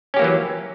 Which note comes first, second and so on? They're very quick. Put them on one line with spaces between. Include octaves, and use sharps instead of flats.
C#4 G4 A#3 E3 F#3